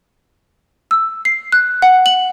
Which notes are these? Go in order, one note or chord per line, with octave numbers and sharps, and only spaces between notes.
E6
C7
F#6
F#5
F#7